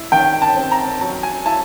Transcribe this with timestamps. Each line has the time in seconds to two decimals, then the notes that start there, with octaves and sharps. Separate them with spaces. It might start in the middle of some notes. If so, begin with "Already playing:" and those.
Already playing: E4
0.12 D#3 G5
0.42 A5
0.56 C4
0.71 A#5
1.01 F#3 A5
1.23 G#5
1.45 E4 A5